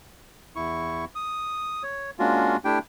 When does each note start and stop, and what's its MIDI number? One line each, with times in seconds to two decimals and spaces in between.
0.56 1.05 40
0.56 1.05 64
0.56 1.05 85
1.15 1.83 87
1.83 2.11 73
2.19 2.57 56
2.19 2.57 58
2.19 2.57 61
2.19 2.57 62
2.19 2.57 65
2.19 2.57 66
2.65 2.79 57
2.65 2.79 62
2.65 2.79 64
2.65 2.79 67
2.65 2.79 79